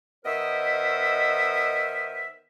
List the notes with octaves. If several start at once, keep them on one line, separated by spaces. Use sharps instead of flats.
D#3 B3 A#4 C5 D#5 E5